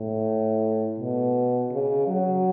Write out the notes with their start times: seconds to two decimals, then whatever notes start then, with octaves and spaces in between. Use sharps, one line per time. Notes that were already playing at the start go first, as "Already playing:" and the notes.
Already playing: A2
0.99 B2
1.72 C#3
2.08 F#3